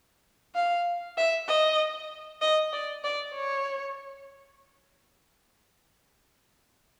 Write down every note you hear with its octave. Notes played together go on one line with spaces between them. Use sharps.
F5
E5
D#5
D#5
D5
D5
C#5